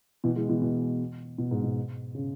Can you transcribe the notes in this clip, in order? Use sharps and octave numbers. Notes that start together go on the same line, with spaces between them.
B2 E3
E3 G#3
B2 E3
B2
B2
G#2
B2
C#3